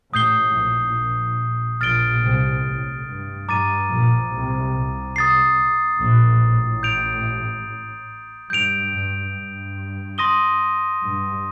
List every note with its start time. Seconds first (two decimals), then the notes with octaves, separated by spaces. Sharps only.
0.14 A1 A2 D#6 G6 C7 G7
0.55 A#1 A#2
0.97 A#1 A#2
1.81 A#1 A#2 F6 A6 D7 G7
2.23 C2 C3
2.65 A1 A2
3.06 G2
3.48 G2 A#5 D6 A6 D#7
3.90 A#1 A#2
4.32 C2 C3
4.74 C2 C3
5.16 D#6 A6 C7
5.99 A#1 A#2
6.41 A1 A2
6.83 G6 D7 F7
8.50 G2 G6 D7 F7
8.92 G2
9.35 G2
10.18 C6 D#6 A#6 D#7 G7
11.02 G2